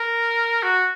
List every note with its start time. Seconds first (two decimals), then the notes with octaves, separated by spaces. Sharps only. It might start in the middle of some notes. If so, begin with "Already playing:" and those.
Already playing: A#4
0.63 F#4